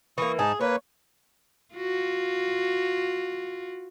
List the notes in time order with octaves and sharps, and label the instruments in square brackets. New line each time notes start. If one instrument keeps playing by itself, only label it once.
[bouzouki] E3 A#3 [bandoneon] C#6 D#6
[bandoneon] G#2 D#4 A5 [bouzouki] G#4
[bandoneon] A#3 B4 [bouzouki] C#5
[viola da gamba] F4 F#4